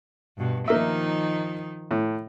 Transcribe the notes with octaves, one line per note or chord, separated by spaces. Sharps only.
G2 B2
D#3 F3 A#3 D#4 E5
A2